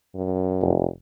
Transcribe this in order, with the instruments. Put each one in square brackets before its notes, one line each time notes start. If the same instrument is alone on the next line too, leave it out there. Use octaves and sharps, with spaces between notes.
[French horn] F#2
[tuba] F1